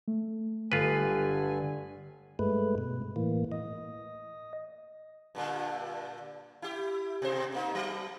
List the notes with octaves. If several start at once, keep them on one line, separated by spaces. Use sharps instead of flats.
A3
G1 G2 D3 F4 B4 G#5
G2 G#3 A3 B4
B2
A2 E3 A#3
D#5
G2 A#2 D3
E4 G4
B2 C5
C3 A#3 D#4
F#3